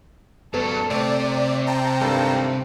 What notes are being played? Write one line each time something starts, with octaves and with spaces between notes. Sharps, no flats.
G2 F#3 B3 A4 A5
C3 A3 C5 D5
G5 A5 A#5
G#1 G2 A4